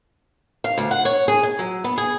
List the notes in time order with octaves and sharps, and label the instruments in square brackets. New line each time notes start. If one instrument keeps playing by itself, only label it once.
[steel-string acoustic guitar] F5
D2
F#5
C#5
G#4
G#5
F#3
B3
G#4